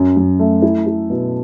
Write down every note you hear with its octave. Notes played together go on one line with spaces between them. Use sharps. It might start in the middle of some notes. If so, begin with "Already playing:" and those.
Already playing: F#2 F#3
F#2
A3
E4
E4
B2